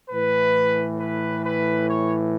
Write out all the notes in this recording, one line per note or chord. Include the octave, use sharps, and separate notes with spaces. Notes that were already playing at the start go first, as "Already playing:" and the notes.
A2 E3 B4
B4
B4
C#5